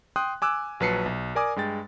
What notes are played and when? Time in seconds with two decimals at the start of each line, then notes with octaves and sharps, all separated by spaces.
0.16 G5 C6 D#6 F#6
0.42 G#5 D6 E6 F#6
0.80 A#1 F#3 B4 A5 C7 C#7
1.06 B1
1.35 A#4 D5 G#5 D6 D#6
1.56 G2 G#3 G5 A6